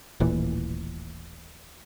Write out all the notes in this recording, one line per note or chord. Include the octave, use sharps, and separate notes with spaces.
D#1 A1 A#2 E3